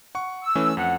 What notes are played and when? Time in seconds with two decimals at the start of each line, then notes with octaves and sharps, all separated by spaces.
0.15 F#5 C#6
0.44 E6
0.55 E3 A3 C#4
0.77 F2 F#5